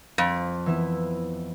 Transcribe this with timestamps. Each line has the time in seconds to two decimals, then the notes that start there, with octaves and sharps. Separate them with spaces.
0.18 F2 F3
0.66 E3 B3 E4